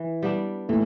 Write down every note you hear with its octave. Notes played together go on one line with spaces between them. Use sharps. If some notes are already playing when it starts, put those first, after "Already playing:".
Already playing: E3
G3 B3 D4
A2 E3 A3